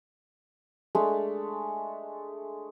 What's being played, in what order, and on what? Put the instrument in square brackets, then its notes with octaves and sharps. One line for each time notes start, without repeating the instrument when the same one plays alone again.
[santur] G#3 A3 D4 A4